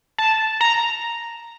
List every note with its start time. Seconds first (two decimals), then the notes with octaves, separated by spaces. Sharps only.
0.18 A5
0.61 A#5